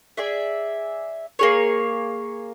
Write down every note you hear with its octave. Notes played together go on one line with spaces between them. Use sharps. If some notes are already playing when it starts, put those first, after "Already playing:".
G#4 D5 E5
A#3 G#4 C#5